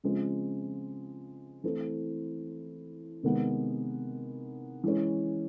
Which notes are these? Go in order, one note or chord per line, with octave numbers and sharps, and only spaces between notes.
C#3 F3 G#3 C4
E3 A3 C4 E4
C3 D#3 G#3 B3
E3 G#3 C#4